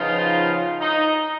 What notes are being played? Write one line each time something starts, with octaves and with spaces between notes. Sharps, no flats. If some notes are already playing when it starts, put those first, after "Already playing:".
Already playing: C#3 F3 B3 D#4 F4
D#4